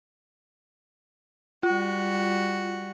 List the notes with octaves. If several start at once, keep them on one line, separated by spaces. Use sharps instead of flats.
G3 F4 F#4